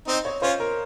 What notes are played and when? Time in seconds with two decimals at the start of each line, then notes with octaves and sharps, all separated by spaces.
0.07 C4 D#4 D#5
0.25 C#5
0.42 C#4 F4 C5
0.60 A#4